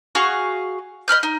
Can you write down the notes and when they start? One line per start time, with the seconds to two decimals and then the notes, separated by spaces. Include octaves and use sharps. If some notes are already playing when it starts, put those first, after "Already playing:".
0.15 F#4 G#4 F5 C#6
1.08 D#5 B5 F6 G6
1.23 D#4